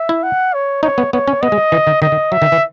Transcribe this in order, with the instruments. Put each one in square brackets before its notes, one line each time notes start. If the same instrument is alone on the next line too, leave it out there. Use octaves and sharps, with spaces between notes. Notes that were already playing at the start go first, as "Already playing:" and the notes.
Already playing: [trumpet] E5
[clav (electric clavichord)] E4
[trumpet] F#5
C#5
[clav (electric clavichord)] D#4 [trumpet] C#5
[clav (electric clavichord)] B3
[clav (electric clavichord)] B3 [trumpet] C#5
[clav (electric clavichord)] C#4
[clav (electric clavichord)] B3 [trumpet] D#5
[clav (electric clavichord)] G#3
E3
D#3
[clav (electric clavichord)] D#3 [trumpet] D#5
[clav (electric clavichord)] D#3
[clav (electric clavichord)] F#3 [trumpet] E5
[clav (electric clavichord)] D#3
E3